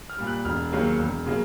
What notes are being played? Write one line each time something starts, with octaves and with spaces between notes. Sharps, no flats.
F6
A#2 G3
F#6
E1 F6
D#2 C#3 F#3 A#3
E1
C#3 F#3 A#3